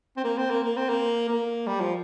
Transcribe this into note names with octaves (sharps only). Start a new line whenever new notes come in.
C4
A#3
C4
A#3
A#3
C4
A#3
A#3
G3
F3